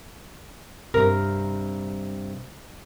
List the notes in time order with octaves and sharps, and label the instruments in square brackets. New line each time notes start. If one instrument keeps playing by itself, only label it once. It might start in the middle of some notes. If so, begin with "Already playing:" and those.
[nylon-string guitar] G2 C3 [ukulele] A#4